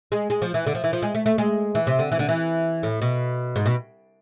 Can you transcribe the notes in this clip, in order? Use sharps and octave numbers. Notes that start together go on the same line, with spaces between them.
G#3
G#3
F3
E3
D3
F3
E3
F3
G#3
A3
A3
G#3
E3
C3
D3
E3
D3
E3
A2
B2
G#2
B2